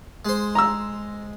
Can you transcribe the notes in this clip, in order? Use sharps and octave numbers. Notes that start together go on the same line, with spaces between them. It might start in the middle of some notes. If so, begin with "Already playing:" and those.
G#3 C5
A#5 E6